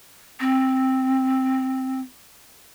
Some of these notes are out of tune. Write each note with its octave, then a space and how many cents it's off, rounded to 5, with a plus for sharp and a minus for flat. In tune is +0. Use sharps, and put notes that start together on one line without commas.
C4 +5